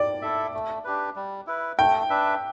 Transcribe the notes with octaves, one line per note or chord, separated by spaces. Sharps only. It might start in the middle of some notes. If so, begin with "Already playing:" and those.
Already playing: D5
E4 A4 E5
A3
D4 G4 B4
G3
E4 B4
A3 G5
D4 B4 E5